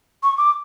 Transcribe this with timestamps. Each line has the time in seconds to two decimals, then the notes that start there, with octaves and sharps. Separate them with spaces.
0.23 C#6
0.38 D6